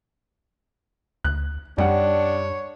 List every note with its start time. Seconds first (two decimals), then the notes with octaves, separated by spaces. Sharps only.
1.24 D2 F#6
1.78 F#2 G3 D4 C#5 F#5